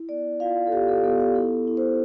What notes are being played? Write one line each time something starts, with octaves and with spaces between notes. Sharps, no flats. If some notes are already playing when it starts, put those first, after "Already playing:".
Already playing: E4
B3 D5
F4 F5
A4
B3 G4
A4
B3 A4
G4
E4 A4
E4
C5